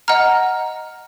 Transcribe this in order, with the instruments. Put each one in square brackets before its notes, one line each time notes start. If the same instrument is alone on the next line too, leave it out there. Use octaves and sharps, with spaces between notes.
[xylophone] D#5 F#5 A#5 F6